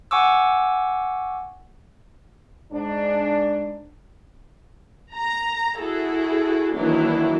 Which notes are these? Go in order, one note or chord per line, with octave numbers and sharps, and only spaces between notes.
F#5 G#5 C#6 D6 E6
G#2 D4
A#5
E4 F#4 G#4 A4
D#3 E3 F#3 A#3 D4 E4